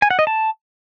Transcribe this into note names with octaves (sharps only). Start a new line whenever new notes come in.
G#5
F#5
D#5
A5